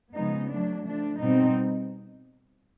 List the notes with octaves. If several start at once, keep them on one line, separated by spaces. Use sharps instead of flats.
C#3 F3 G#3 B3 D#4
F#3 A3 D4
F3 A3 D4
B2 G3 C4 D#4